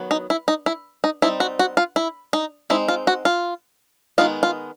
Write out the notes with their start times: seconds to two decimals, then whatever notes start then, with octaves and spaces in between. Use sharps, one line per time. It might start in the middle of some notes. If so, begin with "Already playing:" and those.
Already playing: D#3 F#3 B3
0.11 D#4
0.30 E4
0.48 D#4
0.66 E4
1.04 D#4
1.22 G3 C4 D#4 E4
1.40 F#4
1.59 F#4
1.77 F4
1.96 E4
2.33 D#4
2.70 G#3 C4 D#4 E4
2.88 F4
3.07 F#4
3.25 F4
4.18 D#3 G#3 B3 D#4 F4
4.43 F4